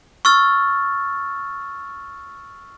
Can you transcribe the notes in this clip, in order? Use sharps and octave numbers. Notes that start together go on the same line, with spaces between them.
C#6 E6 F6 A6